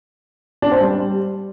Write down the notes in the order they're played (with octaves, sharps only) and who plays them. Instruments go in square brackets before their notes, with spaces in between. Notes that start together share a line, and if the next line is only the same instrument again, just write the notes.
[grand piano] D4
C4
G3